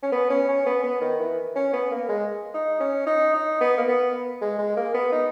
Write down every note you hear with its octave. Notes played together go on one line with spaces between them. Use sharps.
C#4
B3
C#4
C#4
B3
B3
D#3
E3
C#4
B3
A#3
G#3
D#4
C#4
D#4
D#4
B3
A#3
B3
G#3
G#3
A#3
B3
D#4